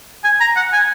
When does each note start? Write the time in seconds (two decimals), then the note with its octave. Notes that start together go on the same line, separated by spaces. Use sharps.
0.24 G#5
0.40 A#5
0.56 F#5
0.73 G#5